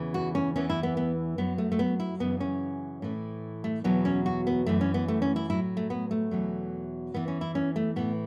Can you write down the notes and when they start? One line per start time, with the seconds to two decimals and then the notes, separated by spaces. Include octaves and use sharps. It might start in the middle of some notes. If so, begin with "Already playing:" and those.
Already playing: E2 C#3 E3
0.14 F#4
0.35 C#4
0.56 E2 E3 C#4
0.70 E4
0.83 B3
0.97 B3
1.38 F#2 F#3 B3
1.58 A3
1.72 A3
1.79 B3
2.00 E4
2.20 F#2 C#3 E3 B3
2.40 C#4
3.02 A2 E3
3.64 A3
3.84 E2 B2 F#3 B3
4.05 C#4
4.26 F#4
4.47 B3
4.66 F#2 E3 A3
4.81 C#4
4.94 B3
5.08 A3
5.22 C#4
5.36 E4
5.50 A2 F#3 E4
5.77 A3
5.90 B3
6.11 A3
6.31 E2 B2 F#3
7.14 E2 E3 B3
7.28 C#4
7.41 E4
7.55 C#4
7.76 A3
7.96 A2 E3 B3